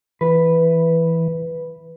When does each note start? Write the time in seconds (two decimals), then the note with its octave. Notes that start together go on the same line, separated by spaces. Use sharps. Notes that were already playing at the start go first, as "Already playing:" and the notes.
0.21 E3 B4